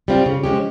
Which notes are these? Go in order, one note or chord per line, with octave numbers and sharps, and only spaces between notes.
G3 C4 F4
C#3
F3 G#3 C#4 G4